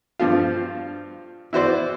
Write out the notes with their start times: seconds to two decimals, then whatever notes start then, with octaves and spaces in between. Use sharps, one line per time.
0.19 G2 F3 F4
1.53 E4 F#4 C5 D5